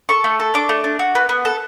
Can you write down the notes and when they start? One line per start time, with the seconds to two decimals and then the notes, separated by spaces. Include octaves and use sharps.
0.09 A4 C#6
0.24 A3
0.40 A4
0.54 D4 D6
0.69 A3
0.84 D4
0.99 F#4
1.15 B3
1.29 B3
1.45 A4